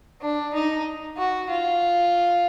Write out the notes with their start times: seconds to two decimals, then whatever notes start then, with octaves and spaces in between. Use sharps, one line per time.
0.21 D4
0.54 D#4
1.17 F#4
1.49 F4